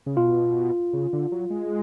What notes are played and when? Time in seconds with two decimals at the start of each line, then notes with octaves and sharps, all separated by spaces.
0.06 C#3
0.17 B2 F4
0.93 C#3
1.13 D3
1.32 F#3
1.50 G#3